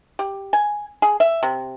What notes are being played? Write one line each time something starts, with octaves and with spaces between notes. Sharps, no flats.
G4
G#5
G#4
E5
C3